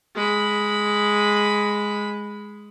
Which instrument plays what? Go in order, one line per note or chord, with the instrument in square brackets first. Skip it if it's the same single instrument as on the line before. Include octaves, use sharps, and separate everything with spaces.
[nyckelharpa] G#3 B5